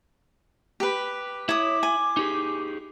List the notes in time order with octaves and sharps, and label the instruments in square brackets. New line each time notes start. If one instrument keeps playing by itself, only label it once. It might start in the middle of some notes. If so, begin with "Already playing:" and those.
[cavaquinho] G4 B4
[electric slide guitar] E4 [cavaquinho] C#5 D#6 [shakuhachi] D6
[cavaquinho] G#5
[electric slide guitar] D#4 G4 G#4